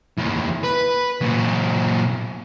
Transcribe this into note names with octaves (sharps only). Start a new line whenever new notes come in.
D#2 E3
B4
A#2 F#3